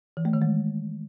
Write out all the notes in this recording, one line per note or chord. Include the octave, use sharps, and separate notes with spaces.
E3
A3
D#3
G#3